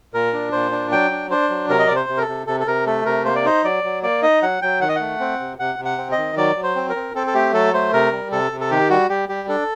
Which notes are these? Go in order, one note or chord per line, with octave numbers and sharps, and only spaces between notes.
A#2 A#4
D4
A#2 C5
D4
F#3 G5
D4
D4 C5
F#3
C3 A#4
D#5
C3 D5
C5
C3
A#4
A4
C3
C3 A4
A4
C3 A#4
A3 A4
C3 A#4
A#3 C5
D5
D#4 C5
F#3 D5
F#3
A#3 D5
D#4 D#5
F#3 F#5
F#3 G5
D#3 F#5
D#5
A3 F#5
C4
C3
C3 F#5
C3
F#5
C4
D#5
D#3
F#3 D5
F#3
C5
C4
A#4
C4
C4 A4
A4
A3 G4
F#3 A4
A3 C5
C3 A#4
G3
C3 A4
C3
A4
D#3 G4
G3 F#4
G3 G4
G3 G4
D4 A4